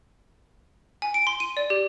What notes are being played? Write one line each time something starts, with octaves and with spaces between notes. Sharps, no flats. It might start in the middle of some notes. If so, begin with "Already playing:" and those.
G#5
D7
C6
D#7
D5
G4